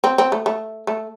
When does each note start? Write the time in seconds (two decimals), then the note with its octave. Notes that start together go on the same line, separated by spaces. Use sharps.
0.04 C4
0.18 C4
0.32 A3
0.46 A3
0.87 A3